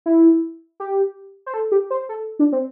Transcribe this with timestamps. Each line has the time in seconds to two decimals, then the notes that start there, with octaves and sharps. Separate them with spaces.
0.06 E4
0.80 G4
1.46 C5
1.54 A4
1.72 G4
1.90 C5
2.09 A4
2.39 D4
2.52 C4